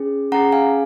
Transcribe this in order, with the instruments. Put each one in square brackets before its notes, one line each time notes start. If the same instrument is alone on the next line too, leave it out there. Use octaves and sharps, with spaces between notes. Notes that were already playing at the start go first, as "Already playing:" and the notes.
Already playing: [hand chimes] C#4 G#4
C#4 G#4 F#5 A#5
F5 G#5